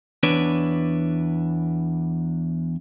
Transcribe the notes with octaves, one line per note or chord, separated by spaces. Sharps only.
E2 D4 B4 C#5